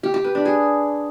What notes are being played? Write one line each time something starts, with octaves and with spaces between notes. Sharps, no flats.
G4
G4
B4
D4
G#4